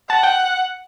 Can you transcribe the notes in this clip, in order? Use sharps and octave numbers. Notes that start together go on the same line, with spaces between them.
F#5 A5
G5